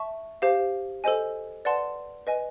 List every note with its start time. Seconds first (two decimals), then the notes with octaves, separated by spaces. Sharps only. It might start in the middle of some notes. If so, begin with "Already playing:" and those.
Already playing: E5 A5 C#6
0.42 G4 C5 F5
1.04 A4 C5 D#5 G#5
1.65 B4 D5 F#5 A5 C6
2.27 B4 D#5 G#5